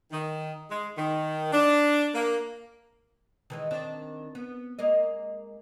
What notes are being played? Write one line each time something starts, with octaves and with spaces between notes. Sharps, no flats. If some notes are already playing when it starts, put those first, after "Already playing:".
D#3
G#3
D#3
D4
A#3
D#3 E3 G#3
D#3 C4 D4
B3
G#3 A#3 D#5